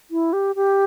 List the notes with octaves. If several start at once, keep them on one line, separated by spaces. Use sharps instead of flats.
E4
G4
G4